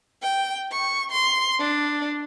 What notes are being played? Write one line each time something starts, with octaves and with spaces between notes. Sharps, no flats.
G5
C#6
C6
D4